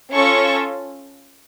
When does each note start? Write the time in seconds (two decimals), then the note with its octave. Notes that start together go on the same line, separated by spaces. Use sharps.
0.10 C#4 F4 A4 C#6